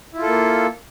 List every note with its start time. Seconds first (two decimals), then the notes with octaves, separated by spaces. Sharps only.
0.14 E4
0.18 F4
0.22 A4
0.27 A#3